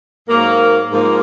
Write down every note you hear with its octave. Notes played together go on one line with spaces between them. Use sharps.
G#2 F#3 A#3
G#2 F3 A#3